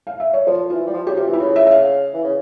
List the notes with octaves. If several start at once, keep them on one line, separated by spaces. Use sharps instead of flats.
F5
E5
C#5
F3 C5
E3 F4
G3
F3
C#3 G4
C3 F4
E3
E4
C#3 F4
E5
E5
F5
E3
C#3